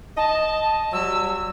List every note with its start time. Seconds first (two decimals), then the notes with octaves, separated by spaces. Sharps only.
0.17 D#5 A5
0.93 F#3 G3 E6